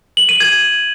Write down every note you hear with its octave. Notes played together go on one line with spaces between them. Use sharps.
F#7
D#7
G#6